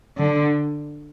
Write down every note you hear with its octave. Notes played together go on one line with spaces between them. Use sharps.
D3